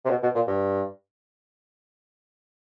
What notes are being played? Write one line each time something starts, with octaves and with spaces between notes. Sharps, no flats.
C3
B2
B2
A#2
G2